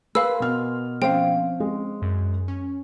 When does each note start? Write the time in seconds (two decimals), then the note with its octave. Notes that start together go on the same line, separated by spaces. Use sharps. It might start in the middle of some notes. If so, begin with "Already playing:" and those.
0.15 A#4 B4 F5 G#5 C6 E6
0.40 B2 F6
1.02 F3 C4 C#4 C5 F5 G5
1.60 G#3
2.02 F#2
2.48 C#4